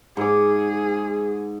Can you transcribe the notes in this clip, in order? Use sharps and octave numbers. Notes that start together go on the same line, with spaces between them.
G#2 G#4 D6